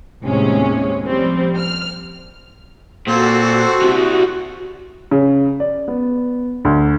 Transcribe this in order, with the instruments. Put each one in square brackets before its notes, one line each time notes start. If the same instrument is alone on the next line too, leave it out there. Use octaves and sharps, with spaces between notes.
[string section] D#2 A2 C3 G#3 C#4
F3 G3 C4
F6
[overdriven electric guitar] A#2 [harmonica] C4 A4 C5 [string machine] F#4
[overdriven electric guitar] C3 G3
[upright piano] C#3
D5
B3
D2